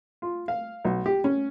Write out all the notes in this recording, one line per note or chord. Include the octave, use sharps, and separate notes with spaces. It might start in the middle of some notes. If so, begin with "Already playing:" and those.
F4
F5
B1
G4
C#4